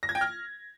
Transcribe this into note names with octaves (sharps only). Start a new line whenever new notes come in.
A#6
G#6
G5
F6